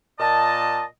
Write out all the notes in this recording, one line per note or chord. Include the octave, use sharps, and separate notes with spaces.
A#2 D#5 A5